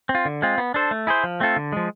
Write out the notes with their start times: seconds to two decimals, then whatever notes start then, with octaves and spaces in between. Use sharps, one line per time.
0.09 C4
0.15 F4
0.25 D3
0.42 G#3 C4 F4
0.58 B3
0.74 D4 A4 C5
0.91 A3
1.07 E4 G#4 C5
1.24 F3
1.40 A3 C4 F4 A4
1.56 D3
1.72 F3 G#3